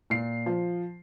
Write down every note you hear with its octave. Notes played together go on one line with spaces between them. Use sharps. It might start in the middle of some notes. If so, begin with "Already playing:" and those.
A#2 C7
F3